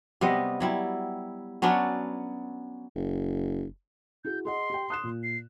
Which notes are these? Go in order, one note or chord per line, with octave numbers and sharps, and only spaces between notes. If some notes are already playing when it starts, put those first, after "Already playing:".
C3 G3 B3 D#5
F#3 G3 E4
F#3 B3 C#4 D4
F#1
E4 F#4 G#4 G6
G#4 D#5 F#5 C6
G4 G5
D#6 F#6 E7
A#2
C7